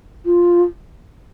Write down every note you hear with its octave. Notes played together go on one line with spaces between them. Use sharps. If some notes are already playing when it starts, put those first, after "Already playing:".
F4